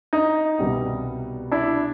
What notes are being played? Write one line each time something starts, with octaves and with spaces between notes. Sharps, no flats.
D#4
C2 B2 G3 B3
D4 E4